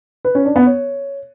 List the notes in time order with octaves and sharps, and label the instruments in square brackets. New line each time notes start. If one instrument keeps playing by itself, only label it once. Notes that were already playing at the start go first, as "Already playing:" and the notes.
[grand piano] B4
C#4
D4
B3
C#5